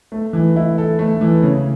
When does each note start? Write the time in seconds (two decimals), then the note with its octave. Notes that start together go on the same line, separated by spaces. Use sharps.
0.12 A3
0.33 E3
0.56 E4
0.78 A4
0.99 A3
1.21 E3
1.43 C#3